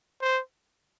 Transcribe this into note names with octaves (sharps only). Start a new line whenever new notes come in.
C5